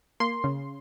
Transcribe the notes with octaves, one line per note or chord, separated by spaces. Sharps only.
A#3 C6
C#3